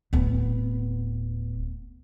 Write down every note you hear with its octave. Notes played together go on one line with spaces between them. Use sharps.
D1 B3